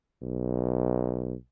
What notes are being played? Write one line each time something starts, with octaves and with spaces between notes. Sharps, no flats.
B1